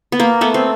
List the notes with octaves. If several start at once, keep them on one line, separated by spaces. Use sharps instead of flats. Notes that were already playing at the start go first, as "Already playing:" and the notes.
B3
A#3
A3 B3
C4